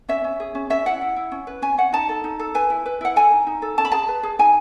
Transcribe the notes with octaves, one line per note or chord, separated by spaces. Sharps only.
C#4 E5
C#4
G#4
C#4
C#4 E5
E4 F#5
E4
E4
C#4
B4
C#4 G#5
C#4 F#5
D#4 A5
A4
D#4
A4
B4 G#5
E4
B4
E4 F#5
A4 G#5
D#4
D#4
A4
C#4 A5
B5
G#4 A5
B4
G#4
D#4 G#5